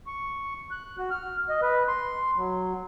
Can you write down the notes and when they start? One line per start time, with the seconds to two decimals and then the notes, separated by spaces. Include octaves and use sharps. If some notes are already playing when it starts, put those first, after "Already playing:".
0.07 C#6
0.71 F#6
0.98 F#4
1.11 F6
1.49 D#5
1.62 B4
1.88 C6
2.36 F#3